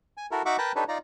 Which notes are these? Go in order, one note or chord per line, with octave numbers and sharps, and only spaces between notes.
G#5
E4 F#4 A4 A#4
D#4 F#4 E5 F#5 C#6 D6
A#4 B4 G5 A5 A#5 F#6
D4 D#4 G4 A4 B4 C#5
D#4 F4 D5 A#5